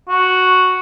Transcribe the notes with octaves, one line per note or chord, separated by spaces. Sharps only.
F#4